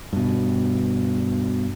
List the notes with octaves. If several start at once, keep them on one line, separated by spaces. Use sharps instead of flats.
G2 B2